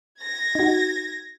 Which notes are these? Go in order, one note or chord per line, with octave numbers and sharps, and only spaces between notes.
G#6 A#6
D#4 F#4